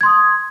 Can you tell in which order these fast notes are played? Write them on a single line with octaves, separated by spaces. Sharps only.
G#6 C6 D#6